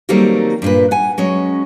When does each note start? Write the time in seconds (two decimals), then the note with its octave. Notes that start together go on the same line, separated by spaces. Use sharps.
0.09 D#3 F#3 G3 A3 A#3 C4
0.62 G2 A#2 B4
0.91 F#5 G#5
1.18 F#3 G#3 C#4